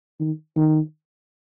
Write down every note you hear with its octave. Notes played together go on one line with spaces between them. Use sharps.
D#3
D#3